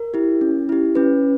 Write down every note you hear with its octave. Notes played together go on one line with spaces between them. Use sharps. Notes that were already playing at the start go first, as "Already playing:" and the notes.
Already playing: A#4
E4 G4
C#4
E4 G4
C#4 B4